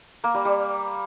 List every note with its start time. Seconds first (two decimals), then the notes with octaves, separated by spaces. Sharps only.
0.24 A#3
0.34 G3
0.45 G3